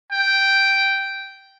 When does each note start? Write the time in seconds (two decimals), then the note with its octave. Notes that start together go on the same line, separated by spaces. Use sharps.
0.12 G5